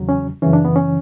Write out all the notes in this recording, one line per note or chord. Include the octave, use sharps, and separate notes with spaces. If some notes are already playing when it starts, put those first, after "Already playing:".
Already playing: E2 C#3 F#3
C#4
F#2 C#3 E3 C#4
D4
B3
C#4